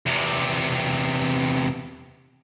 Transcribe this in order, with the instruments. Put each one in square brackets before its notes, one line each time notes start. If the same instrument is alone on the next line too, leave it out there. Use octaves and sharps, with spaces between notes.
[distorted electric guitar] E2 C3